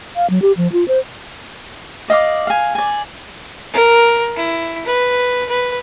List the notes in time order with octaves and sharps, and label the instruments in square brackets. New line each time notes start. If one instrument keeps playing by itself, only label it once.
[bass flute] F5
F#3
G4
F3
F4
C5
[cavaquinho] D5 D#5 F5 D6
F5 G#5
D5 G#5
[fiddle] A#4
E4
B4
B4